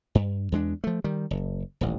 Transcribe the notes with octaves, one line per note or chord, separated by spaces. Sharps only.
G2
E2 G#3 D4
F3 A3
D#3 G3
F#1
D#1 A1